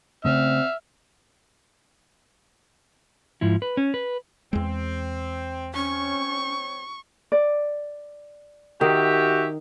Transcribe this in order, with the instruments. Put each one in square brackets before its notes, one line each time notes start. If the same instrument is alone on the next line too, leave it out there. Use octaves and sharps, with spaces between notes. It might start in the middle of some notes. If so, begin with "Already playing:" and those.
[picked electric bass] C#3 A3 [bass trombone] C4 [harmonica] E5 F6
[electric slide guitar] G#2 F3 E4
B4
C#4
B4
[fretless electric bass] E2 G#3 [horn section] C4
[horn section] C4 C#5 [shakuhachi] C#4 [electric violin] C#6
[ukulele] D5
[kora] D#3 [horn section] F#4 G4 E5